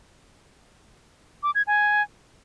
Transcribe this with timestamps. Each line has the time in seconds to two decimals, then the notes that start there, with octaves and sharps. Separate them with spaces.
1.43 D6
1.55 G#6
1.67 G#5